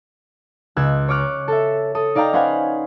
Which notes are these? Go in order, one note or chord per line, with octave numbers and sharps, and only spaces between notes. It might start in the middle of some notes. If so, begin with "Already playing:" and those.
C#2 E6 F#6 G#6
C#5 C#6 D6 F6 F#6
A4 E5
A4 D#6 D#7
D#4 D5 F5 G5 A#5
C#4 B4 C5 F5 F#5 G#5